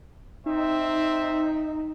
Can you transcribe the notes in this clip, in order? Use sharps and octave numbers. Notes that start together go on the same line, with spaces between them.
C4 D#4 E5